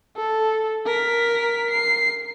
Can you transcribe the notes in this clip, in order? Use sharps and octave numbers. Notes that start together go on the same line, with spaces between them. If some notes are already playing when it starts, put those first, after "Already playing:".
A4
A#4 B6
C7